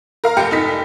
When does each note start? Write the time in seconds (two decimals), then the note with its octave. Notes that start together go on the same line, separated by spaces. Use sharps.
0.24 A#4 F5 A#5
0.37 F1 G4 G5 C#7
0.51 F1 D#4 B6